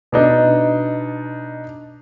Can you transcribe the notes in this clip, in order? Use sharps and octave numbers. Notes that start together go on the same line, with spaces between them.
B2 D4 D#4